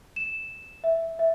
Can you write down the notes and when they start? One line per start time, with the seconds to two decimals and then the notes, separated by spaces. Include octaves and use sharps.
0.16 E7
0.84 E5
1.19 E5